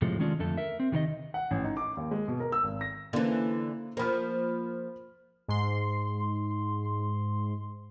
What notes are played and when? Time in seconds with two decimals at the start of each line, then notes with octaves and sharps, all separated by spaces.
0.02 A2 C3 F3 G#3 A4
0.19 D#3 G#3 C#4 D4 F4
0.39 F2 D3 A3 A4
0.57 A#4 E5
0.80 C4
0.92 C3 D#3 A#4 D#5
1.34 F#5
1.51 A1
1.64 D#4
1.77 D6
1.97 D#2
2.11 G#3
2.28 B2
2.40 A#4
2.52 E6
2.64 G#1
2.81 A#6
3.13 D3 E3 A#3 C#4 C5
3.97 F3 A#3 C5 B5 F6
5.48 G#2 C6